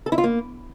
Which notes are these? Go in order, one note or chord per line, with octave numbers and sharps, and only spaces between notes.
A4
E4
F4
A#3